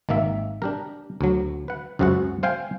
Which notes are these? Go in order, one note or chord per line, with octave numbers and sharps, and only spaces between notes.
G#1 D#3 A#3 E5
D4 G4 A#4
D2 F#3
B4 F#5
C#2 F#2 C4 F#4 G#4 F#5
C5 F5 G5 G#5